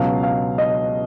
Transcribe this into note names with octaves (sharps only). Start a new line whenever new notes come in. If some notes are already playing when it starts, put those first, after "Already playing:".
Already playing: C#2 B2 F#3 F5
F5
D#5